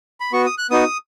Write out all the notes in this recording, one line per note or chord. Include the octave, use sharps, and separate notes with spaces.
B5
B3 F#4 C#6
D#6
F#6
B3 D#4 F#4 D#6